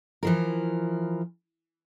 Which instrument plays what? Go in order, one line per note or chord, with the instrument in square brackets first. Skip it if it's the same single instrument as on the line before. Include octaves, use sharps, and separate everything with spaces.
[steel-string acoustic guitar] E3 F3 A#4